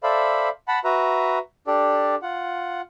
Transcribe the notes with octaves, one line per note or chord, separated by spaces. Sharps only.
A4 C5 D5 E5 F5 B5
F#5 A5 B5
F#4 B4 E5 A#5
D4 G4 A4 D5
F4 F#5